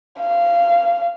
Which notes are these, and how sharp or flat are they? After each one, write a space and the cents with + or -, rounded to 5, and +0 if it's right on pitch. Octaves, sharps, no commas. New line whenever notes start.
F5 -20